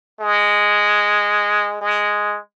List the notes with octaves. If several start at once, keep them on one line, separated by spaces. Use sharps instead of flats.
G#3
G#3